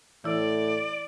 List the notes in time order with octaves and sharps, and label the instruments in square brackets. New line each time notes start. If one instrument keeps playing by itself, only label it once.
[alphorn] A2 [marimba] E3 E4 [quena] D5